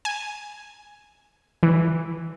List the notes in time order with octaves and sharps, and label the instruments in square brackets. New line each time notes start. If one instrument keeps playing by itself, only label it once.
[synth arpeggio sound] G#5
E3